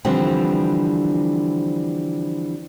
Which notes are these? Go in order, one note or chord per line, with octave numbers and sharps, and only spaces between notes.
D3 E3 F3 G3 C4 D4